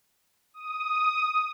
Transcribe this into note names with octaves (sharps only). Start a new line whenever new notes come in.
D#6